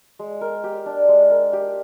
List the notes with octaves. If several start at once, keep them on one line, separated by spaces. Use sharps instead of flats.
G#3
A#4
G4
D4
G#3
A#4
G4